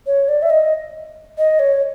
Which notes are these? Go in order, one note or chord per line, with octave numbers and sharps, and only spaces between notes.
C#5
D5
E5
D#5
D#5
C#5